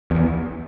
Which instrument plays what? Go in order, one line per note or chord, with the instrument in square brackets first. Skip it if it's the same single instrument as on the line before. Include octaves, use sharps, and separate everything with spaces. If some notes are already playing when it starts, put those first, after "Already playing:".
[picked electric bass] E2